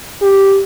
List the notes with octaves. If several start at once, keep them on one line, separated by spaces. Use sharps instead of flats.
G4